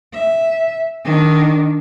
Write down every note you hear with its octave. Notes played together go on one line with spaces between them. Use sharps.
E5
D#3 D4